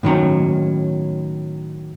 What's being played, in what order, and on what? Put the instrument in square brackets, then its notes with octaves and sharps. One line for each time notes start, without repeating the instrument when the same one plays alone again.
[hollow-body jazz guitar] A2 D#3 F#3 C#4